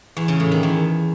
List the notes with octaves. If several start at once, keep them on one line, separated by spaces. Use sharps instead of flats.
E2
C#3
A2
D#3
E2